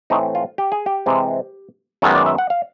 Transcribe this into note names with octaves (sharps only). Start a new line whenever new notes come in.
A2 E3 A3 C4 D#4
F4
G4
G#4
G4
C3 E3 G#3 C4
F#2 D#3 G#3 B3 A4
D5
E5
F#5
F5